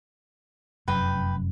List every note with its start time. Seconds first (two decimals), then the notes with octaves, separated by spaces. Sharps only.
0.88 F1 F#2 B4 G5